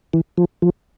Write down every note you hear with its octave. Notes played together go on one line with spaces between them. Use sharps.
E3
F3
F3